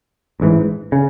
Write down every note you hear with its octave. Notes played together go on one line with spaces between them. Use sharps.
A1 G#2 E3
C#3